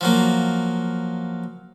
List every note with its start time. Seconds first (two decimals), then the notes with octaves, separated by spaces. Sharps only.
0.01 F3 F#3 A#3